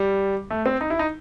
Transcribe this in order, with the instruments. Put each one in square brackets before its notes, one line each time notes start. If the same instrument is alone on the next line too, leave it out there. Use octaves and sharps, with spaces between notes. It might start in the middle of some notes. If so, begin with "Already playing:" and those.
Already playing: [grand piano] G3
A3
C4
D#4
E4
D#4